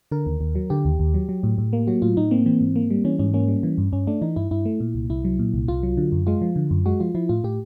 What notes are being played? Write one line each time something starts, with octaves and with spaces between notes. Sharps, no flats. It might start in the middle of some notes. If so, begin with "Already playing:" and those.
D3 A#4
D#2
D#2
F#3
D3 G4
D#2
D#2
F#3
F#3
A2
A2
A#3
F#3 F#4
A2 F4
A2 D#4
A#3 C4
E3 C4
G#2
A#3
G3
E3 C#4
G#2 C#4
A#3 C#4
G3
E3
G2
G2 C#4
A3 D4
E3 D#4
G2 E4
G2 E4
A3
A#2
C2
C2 E4
F#3
A#2
C2
C2 F4
F#3
D3
F#2
G#3 F4
F3
D3
F#2
G#3 F#4
F3 F4
F3 E4
A2 F4
A2 G4